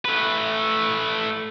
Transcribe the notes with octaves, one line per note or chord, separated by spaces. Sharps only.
A3 B4